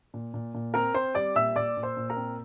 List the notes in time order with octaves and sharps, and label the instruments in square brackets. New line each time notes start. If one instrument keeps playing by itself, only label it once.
[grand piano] A#2
A#2
A#2
C4 A#4 A#5
C4 C5 C6
G3 D5 D6
A#2 E5 E6
A#2 D5 D6
A#2
C5 C6
A#2
A#4 A#5
C4